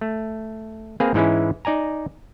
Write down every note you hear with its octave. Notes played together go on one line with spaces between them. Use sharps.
A3
A#3 C4 G#4 B4 F5
G#2 E3 G#3 C#4 E4
D#4 D5 G#5 A#5